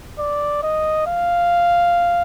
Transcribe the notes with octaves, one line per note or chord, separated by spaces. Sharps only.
D5
D#5
F5